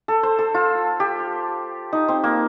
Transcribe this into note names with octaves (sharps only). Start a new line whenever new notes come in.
A4
C5
A4
F4
G4
D#4
C4
A#3